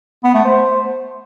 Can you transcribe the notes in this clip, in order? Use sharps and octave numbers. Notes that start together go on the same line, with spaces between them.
B3
A3
C5